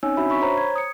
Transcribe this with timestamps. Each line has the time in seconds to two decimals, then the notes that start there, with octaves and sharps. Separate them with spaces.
0.03 C4 C#4 D#4 C#5 G#5 E6
0.17 D4 F#4 E5 B5
0.30 B5 C#6 B6
0.42 C5 C#5 A#5
0.57 G#6
0.76 D#6 C#7